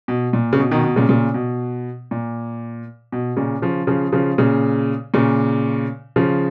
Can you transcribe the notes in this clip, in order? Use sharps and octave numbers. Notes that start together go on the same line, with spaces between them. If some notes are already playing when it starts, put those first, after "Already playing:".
B2
A#2
C#3
B2
B2 D#3
B2
A#2 C#3
A#2 C#3
B2
A#2
B2
A#2 C#3
C#3 F3
C#3 F3
C#3 F3
A#2 C#3
A#2 C#3
C#3 F3